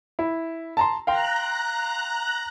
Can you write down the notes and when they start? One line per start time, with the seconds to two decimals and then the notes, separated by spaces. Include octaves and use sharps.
0.19 E4
0.77 A5 A#5 C6
1.07 F5 G5 A#5 C6 F#6